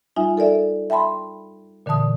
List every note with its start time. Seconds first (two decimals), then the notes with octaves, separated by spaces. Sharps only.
0.16 G3 D#4 F4 E5 G#5
0.37 A4 A#4 D5 E5
0.90 E5 G5 A5 B5 C6
1.86 A#2 D3 E3 A5 D#6